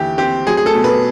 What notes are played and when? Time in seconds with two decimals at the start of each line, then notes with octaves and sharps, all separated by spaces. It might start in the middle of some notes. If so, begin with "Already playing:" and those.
Already playing: D#2 D3 E3 G4
0.18 C4 G4
0.47 F#3 G#4
0.57 G#4
0.66 A4
0.75 B2
0.84 B4